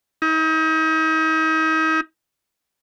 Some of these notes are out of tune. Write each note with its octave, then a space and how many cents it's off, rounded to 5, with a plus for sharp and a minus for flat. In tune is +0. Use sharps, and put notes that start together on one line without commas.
D#4 +35